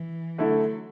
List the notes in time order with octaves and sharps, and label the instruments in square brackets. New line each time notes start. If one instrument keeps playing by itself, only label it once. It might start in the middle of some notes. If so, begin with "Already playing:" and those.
Already playing: [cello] E3
[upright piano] D3 A3 E4 [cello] F#3